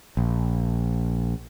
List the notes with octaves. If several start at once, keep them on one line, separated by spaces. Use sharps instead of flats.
A#1